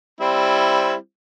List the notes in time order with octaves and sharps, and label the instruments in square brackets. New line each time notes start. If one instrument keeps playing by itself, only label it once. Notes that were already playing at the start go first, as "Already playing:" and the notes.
[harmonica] G3 C4 E4